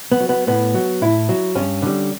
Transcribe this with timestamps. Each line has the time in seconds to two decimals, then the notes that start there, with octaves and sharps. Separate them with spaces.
0.12 B3
0.20 F#3
0.29 B3
0.47 A2 B3
0.74 F#3
1.01 A2 E4
1.29 F#3
1.56 G2 C#4
1.82 D3 G3